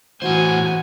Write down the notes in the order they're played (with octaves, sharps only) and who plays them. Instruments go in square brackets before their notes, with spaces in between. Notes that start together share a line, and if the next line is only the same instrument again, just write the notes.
[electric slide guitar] A2 C5 [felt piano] E3 F#4 [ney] F#5 [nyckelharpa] G#5